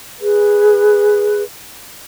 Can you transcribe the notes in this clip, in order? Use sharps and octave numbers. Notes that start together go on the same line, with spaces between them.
G#4 B4